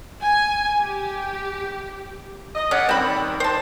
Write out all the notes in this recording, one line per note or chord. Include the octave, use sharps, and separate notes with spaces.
G#5
G4
D#5
C#4 G#4 D5 F#5
D#3 G3 C4 B5
C5 A5